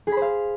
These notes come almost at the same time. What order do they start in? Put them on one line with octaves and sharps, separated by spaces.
G#4 B5 C5 F5